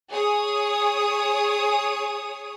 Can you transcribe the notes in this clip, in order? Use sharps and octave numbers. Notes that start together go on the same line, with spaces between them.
G#4 C#5 D#6